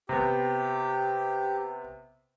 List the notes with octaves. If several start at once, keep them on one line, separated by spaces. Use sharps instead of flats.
C3 B3 G4